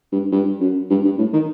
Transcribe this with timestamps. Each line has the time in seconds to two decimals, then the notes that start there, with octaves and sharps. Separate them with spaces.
0.12 G2
0.32 G2
0.60 F#2
0.90 G2
1.05 G2
1.18 A2
1.33 D#3